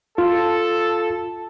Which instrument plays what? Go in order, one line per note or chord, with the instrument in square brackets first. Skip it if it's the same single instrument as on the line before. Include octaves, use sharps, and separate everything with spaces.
[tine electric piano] F4 [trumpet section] A4